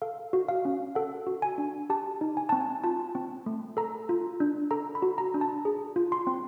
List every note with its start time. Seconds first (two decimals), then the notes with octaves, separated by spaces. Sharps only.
0.02 A4 F5
0.33 F#4
0.48 F5
0.65 C#4
0.95 A4 F#5
1.27 F#4
1.42 G#5
1.58 D4
1.90 G4 A5
2.21 D#4
2.37 G#5
2.49 C4 A5
2.61 G#5
2.84 F4 A5
3.15 C4
3.46 A3
3.77 A4 A#5
4.09 F4
4.40 D4
4.71 A4 A#5
4.95 B5
5.02 F#4
5.18 A#5
5.34 D4
5.41 A5
5.65 G#4
5.96 F4
6.12 C6
6.27 C4